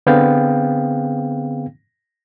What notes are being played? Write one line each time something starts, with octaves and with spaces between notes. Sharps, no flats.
D3 B3 C4 G#4 F5 G5